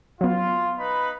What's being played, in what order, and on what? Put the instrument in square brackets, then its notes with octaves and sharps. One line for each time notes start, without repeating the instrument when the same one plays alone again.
[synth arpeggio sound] F#3 B3 [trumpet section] F4
[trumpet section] D#4 B4 B5